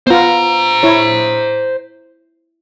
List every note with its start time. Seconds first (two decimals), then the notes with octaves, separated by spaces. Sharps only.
0.07 B3 F4 C5 A#5
0.83 E4 C#5